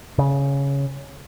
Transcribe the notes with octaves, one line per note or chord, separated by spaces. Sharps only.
C#3